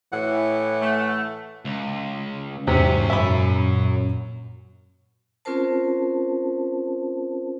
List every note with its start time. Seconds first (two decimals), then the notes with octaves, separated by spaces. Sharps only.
0.13 A2 E3 F#5
0.81 A3
1.65 C#2
2.67 E2 G#2 C3 F#3 C#4
3.10 F#2 A#2 E5 B5
5.45 C4 C#4 F4 A#4 C5 A5